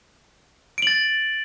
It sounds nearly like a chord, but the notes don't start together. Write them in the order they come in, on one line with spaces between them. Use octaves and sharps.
D7 F#7 A6